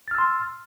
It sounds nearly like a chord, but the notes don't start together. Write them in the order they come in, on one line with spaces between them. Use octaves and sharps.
A6 F6 E6 C6